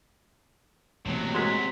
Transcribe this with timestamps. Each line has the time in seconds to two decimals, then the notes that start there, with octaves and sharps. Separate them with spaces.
1.06 E1 A2 C3 F#3 A#3
1.34 G#3 F#4 A#4 C6 B6